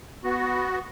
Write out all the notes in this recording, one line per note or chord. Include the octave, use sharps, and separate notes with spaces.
B3 F#4